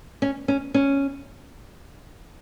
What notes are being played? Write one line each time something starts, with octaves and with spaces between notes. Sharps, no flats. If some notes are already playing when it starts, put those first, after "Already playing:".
C#4
C#4
C#4